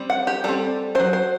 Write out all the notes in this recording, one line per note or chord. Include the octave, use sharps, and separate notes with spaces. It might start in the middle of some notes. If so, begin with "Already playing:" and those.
Already playing: G3 C4
F#5
G4
G3 C4 A4
F#3 C4 C5
C5